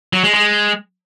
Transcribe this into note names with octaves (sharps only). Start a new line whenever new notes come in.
F#3
G#3
G#3